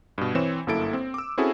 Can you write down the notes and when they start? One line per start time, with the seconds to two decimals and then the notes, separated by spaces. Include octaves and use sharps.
0.18 G2 B2
0.35 E3 C4 C#5 E7
0.67 G1 F#2 A#3 E4 A4 D7
0.93 C4
1.14 D6 E6
1.38 C4 C#4 E4 F#4 G#4 A4